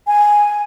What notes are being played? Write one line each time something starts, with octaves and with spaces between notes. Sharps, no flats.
G#5